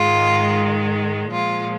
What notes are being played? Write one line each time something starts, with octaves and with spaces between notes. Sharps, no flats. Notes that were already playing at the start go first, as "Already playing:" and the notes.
Already playing: G#2 D#3 G#3 F4
A#2 F3 G#3 F4